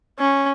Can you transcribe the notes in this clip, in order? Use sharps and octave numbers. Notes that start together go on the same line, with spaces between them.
C#4